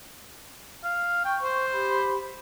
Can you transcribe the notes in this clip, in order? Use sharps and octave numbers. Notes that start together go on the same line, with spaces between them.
F5
G5 C#6
C5
G4 B5